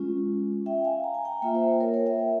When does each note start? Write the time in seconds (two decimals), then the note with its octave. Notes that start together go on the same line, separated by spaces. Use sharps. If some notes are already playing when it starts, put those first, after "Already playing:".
Already playing: G#3 C#4 F4
0.66 E5 G5
0.85 F5 G#5
1.04 A#5
1.14 G#5
1.25 G5 A#5
1.42 A#3 F4 E5 G5
1.55 C5 E5
1.80 A#4 C#5
1.94 A#4 C#5
2.06 E5 G5